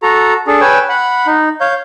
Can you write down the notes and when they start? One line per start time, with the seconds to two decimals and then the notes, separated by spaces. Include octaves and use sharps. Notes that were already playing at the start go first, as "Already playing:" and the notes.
0.03 F#4 A4 A#5
0.47 D4 G#4 A4
0.61 B4 C#5 G5 G#5 E6
0.89 F#5 B5
1.27 D#4
1.61 C#5 F5 G6